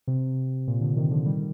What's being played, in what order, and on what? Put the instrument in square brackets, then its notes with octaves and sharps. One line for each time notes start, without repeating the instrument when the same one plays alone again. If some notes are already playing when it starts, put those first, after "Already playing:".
[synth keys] C3
A#2
A#2 D3
C3 D#3
D3 F3
D#3 G3